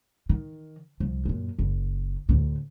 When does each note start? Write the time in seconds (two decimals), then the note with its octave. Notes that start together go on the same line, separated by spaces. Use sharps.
0.29 D#3
1.00 C2 F3
1.25 F#2 A#2
1.59 F#1
2.29 D2 A2